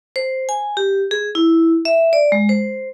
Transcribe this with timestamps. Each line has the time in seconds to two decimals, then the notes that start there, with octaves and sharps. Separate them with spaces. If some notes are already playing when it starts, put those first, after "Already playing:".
0.16 C5
0.49 G#5
0.77 G4
1.11 G#4
1.35 E4
1.85 E5
2.13 D5
2.32 G#3
2.49 C5